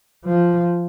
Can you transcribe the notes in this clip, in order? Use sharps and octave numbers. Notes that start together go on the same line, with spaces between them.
F3